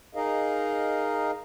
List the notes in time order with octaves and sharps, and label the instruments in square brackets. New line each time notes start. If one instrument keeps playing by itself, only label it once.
[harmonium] D#4 G#4 A#4 D#5 F5